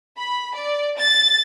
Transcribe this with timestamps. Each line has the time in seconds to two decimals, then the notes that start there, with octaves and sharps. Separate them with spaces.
0.17 B5
0.55 D5
0.97 A6